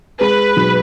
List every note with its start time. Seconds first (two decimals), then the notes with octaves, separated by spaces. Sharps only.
0.21 G#3 B4
0.57 B1